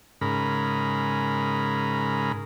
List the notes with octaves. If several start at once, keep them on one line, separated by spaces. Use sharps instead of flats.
G#2 C#3 A#4 B5